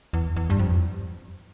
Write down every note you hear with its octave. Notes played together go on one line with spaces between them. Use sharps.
E2
E2
G2
F2